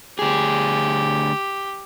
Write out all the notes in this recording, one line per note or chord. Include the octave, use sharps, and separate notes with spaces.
D2 G4 G#4